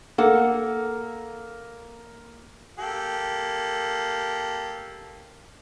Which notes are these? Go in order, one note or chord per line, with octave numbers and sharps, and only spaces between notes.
A#3 A4 F#5
A#3 G4 A4